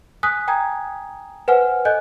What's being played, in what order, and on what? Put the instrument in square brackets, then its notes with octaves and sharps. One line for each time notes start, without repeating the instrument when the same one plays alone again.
[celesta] G#5 D#6 F#6 B6
G5 G#5 A#5 D#6 G#6
B4 C5 F#5 G#5 F6
A4 D#5 G#5 F#6 G6